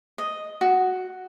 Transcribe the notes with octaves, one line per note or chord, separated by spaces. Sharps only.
D#5
F#4